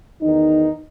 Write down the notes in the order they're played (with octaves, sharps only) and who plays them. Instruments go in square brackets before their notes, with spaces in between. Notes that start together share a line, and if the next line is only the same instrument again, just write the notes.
[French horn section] E2 D#3 D#4